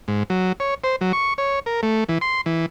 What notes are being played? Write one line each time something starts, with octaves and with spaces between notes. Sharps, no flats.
G#2
F#3
C#5
C5
F#3
C#6
C#5
A#4
A3
E3
C6
E3